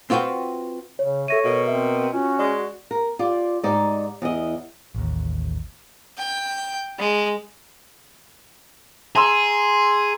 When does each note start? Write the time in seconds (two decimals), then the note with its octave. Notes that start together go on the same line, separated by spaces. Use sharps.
0.10 C4 F4 F#4 B4 G5
0.99 C#3 C#5
1.28 A4 C#5 E5 A#6 D#7
1.45 B2 A#4
1.67 C4 E5
2.13 C#4 F4 F#4
2.39 G#3 D5
2.91 A#4
3.19 F4 G4 D5
3.63 G#2 D#4 G4 D5
4.22 E2 D#5
4.95 A1 D#2
6.18 G5
6.99 G#3
9.15 G#4 A#5 C6 E6